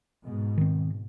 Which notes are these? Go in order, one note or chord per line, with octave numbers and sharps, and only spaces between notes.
G#2 B2
D#3 C4